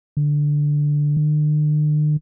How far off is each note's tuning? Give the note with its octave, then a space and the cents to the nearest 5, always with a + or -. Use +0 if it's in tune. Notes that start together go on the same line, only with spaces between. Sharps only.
D3 +0
D3 +45